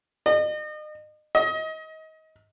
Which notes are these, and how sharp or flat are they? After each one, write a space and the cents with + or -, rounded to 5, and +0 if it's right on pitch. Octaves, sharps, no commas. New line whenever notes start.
D#5 -35
D#5 +30